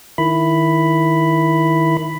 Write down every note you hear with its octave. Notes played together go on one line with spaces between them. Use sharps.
D#3 E4 B5